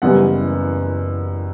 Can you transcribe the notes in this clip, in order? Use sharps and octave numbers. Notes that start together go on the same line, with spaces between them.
F#1 F#2 E3 G3 B3 F#5